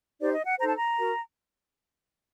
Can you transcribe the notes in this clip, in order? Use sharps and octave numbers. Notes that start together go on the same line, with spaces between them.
D#4 G4 C5 D5
D#5
F#5
D#4 A4 C5 A#5
A5
A#5
F#4 A#4